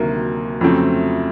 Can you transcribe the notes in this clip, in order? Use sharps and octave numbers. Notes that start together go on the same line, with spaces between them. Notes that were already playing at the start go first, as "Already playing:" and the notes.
Already playing: D2 C3 D#3 F#3 A#3
F2 C#3 F#3 A3 C4